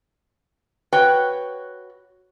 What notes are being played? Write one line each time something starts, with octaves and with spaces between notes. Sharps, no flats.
F#4 B4 C#5 G5